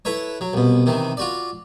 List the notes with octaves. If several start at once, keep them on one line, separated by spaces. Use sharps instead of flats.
E4 A4 B4 C#5
F#3
C2 B2
C3 D#3 E3
F4 F#4 D5